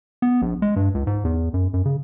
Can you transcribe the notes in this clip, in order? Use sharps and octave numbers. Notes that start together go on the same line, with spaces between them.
B3
A#1
G#3
G2
C#2
G#2
E2
F#2
F#2
C#3